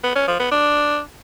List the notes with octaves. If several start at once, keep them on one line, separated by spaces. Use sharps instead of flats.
B3
C#4
F3
B3
D4